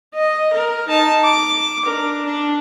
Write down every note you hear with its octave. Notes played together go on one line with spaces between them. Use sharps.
D#5
A#4
D#4 A5
D6
D4 A#4
D4